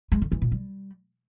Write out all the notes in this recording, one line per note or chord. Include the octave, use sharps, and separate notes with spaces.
G#3
D3
E3
A#2
G3